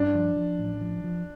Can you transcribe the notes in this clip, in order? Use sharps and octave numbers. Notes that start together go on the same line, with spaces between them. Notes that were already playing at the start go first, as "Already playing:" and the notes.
Already playing: G2 D4
F3
F3
A1
F3
F3